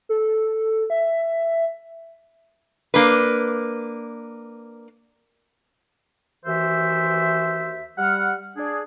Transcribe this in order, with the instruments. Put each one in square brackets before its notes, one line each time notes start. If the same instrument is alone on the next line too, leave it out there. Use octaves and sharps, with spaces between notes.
[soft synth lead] A4
E5
[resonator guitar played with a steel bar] A#3 D4 B4
[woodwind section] D#2 E3 F#4 C5 E5
G3 F#5 F6
D4 G#4